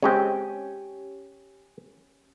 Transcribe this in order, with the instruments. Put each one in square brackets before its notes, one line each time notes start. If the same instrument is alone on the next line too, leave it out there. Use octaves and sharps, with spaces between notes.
[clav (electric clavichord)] C#3 G#3 C4 [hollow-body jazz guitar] C#4 G4